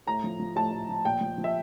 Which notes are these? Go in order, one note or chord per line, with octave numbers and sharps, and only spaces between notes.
A2 A#5
F3
F3
A2 A5
A2
F3
A#2 G5
F3
F3
E5